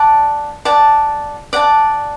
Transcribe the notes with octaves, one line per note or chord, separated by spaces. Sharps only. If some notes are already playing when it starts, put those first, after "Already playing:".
Already playing: D5 F#5 A5
D5 F#5 A5
D5 F#5 A5